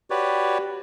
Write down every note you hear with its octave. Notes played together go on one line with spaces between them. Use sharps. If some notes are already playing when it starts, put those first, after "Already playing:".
F#4 G4 B4 C#5 D5